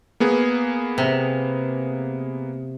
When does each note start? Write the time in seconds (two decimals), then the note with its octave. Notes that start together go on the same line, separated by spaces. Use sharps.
0.20 A#3 B3 G#4
0.98 C3